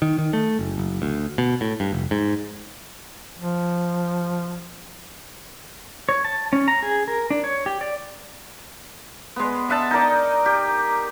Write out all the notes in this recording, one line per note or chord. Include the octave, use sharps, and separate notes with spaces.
D#3
D#3
A3
F#1
F#1
D2
B2
A2
G2
F1
G#2
F3
C#5
A5
C#4
A#5
G#4
A#4
D4
C#5
G4
D5
G#3 B3
D#5 E5 F#5 A5
D#4 A#4 D5
G4